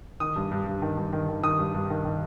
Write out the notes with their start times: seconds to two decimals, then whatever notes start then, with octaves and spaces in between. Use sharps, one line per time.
0.20 D#3 D#6
0.36 G2
0.51 G2
0.67 G2
0.82 D#3
0.97 G2
1.13 D#3
1.28 D#3
1.43 D#3 D#6
1.59 G2
1.74 G2
1.90 D#3
2.05 D#3